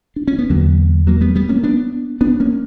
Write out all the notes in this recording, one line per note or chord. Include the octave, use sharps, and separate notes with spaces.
D4
C#4
B3
E2 D3 F#3 A#3
F#3 A#3
G3 B3
G3 B3
A#3 C#4
B3 D4
B3 D4
A#3 C#4